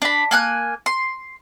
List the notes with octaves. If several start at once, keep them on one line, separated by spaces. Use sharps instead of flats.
D4 B5
A#3 G#5 F#6
C6